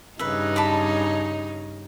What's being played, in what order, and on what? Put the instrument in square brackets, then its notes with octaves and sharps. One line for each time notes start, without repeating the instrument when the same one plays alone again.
[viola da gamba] G2 C#3 D#4 [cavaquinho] B4 E5
[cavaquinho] A5 B5 D6